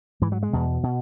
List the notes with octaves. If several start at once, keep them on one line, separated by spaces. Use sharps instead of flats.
G#2 E3
F#3
G#3
E2 B2
B2